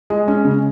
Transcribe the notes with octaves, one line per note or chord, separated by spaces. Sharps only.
G#3
C#4
C#3